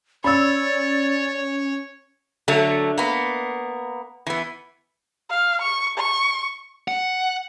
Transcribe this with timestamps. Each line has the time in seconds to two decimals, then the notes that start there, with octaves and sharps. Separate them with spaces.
0.24 C#4 C#5 D5 B5 E6
2.48 D3 F#3 A3
2.98 A#3 B3
4.27 E3 B3
5.29 F5
5.62 C#6
5.98 C#6
6.88 F#5